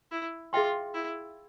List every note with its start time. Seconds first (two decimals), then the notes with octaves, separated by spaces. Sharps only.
0.11 E4
0.53 F4 G#4 E5 G5 C6
0.94 E4